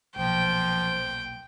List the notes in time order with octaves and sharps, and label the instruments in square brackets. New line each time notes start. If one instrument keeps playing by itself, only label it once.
[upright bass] D#1 B1 [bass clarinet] F3 [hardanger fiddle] G5